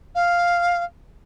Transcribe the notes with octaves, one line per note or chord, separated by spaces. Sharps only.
F5